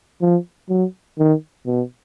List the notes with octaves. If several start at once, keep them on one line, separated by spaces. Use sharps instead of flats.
F3
F#3
D#3
B2